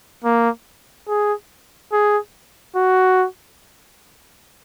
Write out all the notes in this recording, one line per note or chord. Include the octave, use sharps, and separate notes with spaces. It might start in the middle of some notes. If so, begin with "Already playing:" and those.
A#3
G#4
G#4
F#4